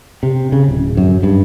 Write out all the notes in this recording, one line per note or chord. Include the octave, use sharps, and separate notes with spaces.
C3
C#3
D1
F#2
G2